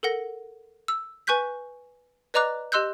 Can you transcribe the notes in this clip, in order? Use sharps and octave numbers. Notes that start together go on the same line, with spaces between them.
A4 A#4 F#5 A#6
E6
B4 G#5 C#6 F#6 G6 B6
B4 D5 D#5 A#5 D6 F#6
G4 D#5 C6 E6 F#6 G6